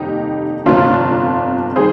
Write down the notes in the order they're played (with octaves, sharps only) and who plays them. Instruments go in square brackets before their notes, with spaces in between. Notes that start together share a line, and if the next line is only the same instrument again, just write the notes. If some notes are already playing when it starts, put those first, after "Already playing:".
Already playing: [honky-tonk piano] F1 D#2 G3 D#4 G4
G1 F2 C3 D4 F4
D#3 G3 G#4 C5